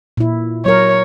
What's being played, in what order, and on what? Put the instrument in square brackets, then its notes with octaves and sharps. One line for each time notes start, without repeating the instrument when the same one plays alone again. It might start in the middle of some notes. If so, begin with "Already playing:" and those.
[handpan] A#2 E4
[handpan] F#3 A#4 [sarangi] C#5